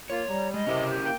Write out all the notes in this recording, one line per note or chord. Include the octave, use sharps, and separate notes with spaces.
A#3 F4 C#5
G3 A#5
G#3 D#5
C3 C#4 E4 A#4
G4
A#3 G5